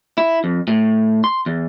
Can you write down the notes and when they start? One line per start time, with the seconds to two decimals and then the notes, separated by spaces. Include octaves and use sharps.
0.18 E4
0.44 F2
0.68 A2
1.24 C6
1.46 E2